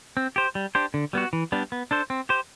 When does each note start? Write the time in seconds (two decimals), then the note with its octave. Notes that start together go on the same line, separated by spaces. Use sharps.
0.17 C4
0.36 G4 C5
0.55 G3
0.75 D4 G4 C5
0.94 D3
1.13 G3 B3 F#4
1.33 E3
1.52 G3 B3 D4
1.72 B3
1.91 D4 A4 C5
2.10 C4
2.29 G4 C5